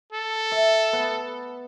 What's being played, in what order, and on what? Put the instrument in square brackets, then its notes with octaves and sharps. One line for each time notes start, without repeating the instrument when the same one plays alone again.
[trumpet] A4
[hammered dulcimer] E5
B3